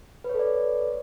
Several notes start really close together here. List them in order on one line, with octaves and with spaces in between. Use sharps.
B4 C#5 A4 D5